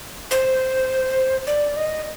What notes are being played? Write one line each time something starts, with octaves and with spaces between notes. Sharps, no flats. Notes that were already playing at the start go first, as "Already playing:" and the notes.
C5
D5
D#5